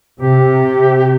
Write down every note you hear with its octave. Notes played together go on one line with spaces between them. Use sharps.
C3 G4